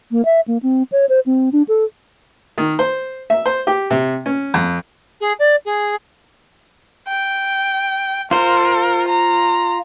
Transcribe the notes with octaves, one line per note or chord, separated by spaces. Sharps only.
A#3
E5
A#3
C4
C#5
C5
C4
D4
A4
D#3
C5
E5
C5
G4
C3
C#4
F2
G#4
D5
G#4
G5
F4 A#4 C5
A#5